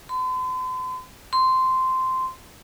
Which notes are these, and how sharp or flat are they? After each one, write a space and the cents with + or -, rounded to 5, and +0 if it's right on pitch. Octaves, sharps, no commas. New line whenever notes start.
C6 -45
C6 -10